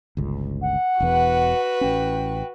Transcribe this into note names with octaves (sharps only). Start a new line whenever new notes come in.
G1 C#2
F#5
E1 E2 F#4 B4
A1 C#4 G5